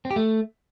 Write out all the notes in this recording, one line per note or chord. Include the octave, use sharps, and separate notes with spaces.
C4
G4
A3